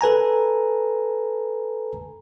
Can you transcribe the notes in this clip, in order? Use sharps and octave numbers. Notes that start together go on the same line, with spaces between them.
A4 B4 G#5 A#5